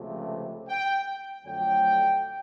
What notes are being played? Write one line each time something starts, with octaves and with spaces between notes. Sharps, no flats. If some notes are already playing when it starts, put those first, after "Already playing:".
Already playing: C#2 C3 F3 A3
G5
F2 D3 F#3 A3 G5